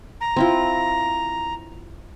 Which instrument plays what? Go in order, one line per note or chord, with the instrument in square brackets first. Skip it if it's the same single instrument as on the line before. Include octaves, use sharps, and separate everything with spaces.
[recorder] A#5
[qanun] C4 E4 F4